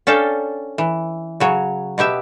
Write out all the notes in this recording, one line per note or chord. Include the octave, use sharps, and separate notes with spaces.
C#4 D4 A4 F5 G5
E3
C#3 F#3 C#5
B2 B3 G4 E5